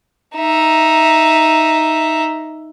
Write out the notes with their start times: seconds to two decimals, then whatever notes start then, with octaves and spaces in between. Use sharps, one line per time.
0.37 D#4 E5